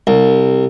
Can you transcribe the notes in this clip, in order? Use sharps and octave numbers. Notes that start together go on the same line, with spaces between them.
C2